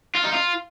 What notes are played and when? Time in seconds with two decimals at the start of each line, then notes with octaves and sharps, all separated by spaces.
0.15 F4
0.24 D#4
0.33 F4